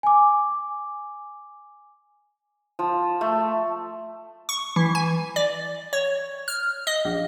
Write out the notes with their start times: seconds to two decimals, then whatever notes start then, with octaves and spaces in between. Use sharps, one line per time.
0.03 G#5 D6
2.79 F3
3.21 A3
4.49 C#6
4.76 E3
4.95 G#5
5.36 D5
5.93 C#5
6.48 F6
6.87 D#5
7.05 A#1